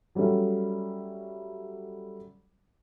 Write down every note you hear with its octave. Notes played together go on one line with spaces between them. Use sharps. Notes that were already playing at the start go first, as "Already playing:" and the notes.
F#3 G3 A3 C#4